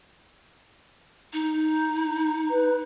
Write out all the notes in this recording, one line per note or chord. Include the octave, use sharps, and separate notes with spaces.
D#4
B4